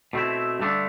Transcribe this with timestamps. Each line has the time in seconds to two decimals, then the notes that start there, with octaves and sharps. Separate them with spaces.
0.13 B2 A3 C4 E4
0.60 G2 D3 A3 D4